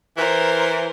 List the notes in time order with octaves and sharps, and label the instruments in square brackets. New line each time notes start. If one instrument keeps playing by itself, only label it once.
[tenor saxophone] E3 [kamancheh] A#4 C5